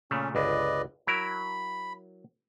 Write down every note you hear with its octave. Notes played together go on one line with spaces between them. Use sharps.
A#2 C#3 A3 C#4
G1 C#2 B4 D5 D#5
F#3 E4 A#4 B5